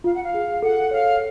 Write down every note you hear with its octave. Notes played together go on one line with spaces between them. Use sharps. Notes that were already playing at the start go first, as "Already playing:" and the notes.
F4 F5
F#5
F5
G#4
A4 F#5
C#5 F5